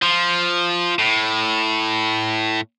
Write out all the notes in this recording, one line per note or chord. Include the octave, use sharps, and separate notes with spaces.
F3
A2